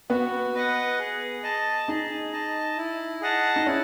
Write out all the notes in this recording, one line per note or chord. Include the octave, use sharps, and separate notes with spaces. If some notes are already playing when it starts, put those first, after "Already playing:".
B3 F#4
B4 D#5 F#5
G#4
D#5 A5
D#4 G#4
D#5 A5
E4
G#4 D#5 F#5 A5
D#4
C#4 E4